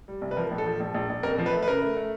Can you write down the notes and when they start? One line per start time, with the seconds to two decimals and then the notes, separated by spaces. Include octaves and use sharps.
0.08 G3
0.21 C2
0.31 B4
0.37 F3 A#4
0.51 A#1
0.58 A4
0.66 F3
0.80 A#1
0.94 A#1
1.09 A#1
1.23 F2 A#4
1.38 F3
1.46 B4
1.53 A3
1.63 B4
1.67 C#3 A#4
1.82 A3
1.97 A3